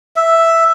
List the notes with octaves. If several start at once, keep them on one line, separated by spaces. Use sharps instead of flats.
E5